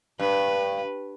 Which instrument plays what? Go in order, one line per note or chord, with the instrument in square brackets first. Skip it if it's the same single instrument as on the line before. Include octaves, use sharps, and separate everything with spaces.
[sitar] G2 [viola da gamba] B4